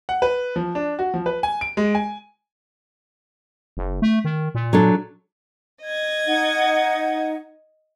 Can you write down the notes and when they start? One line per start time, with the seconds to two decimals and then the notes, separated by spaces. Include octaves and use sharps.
0.09 F#5
0.22 B4
0.56 F3
0.75 D4
0.99 F#4
1.14 F3
1.26 B4
1.43 G#5
1.61 D7
1.77 G#3
1.95 G#5
3.77 F#1
4.02 A3
4.25 D#3
4.55 A#2
4.73 F#3 D4 A4
5.81 D#5 G#6
6.26 D#4 F#5